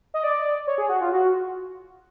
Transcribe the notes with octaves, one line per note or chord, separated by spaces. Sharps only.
D#5
D5
C#5
G#4
F#4
F4
F#4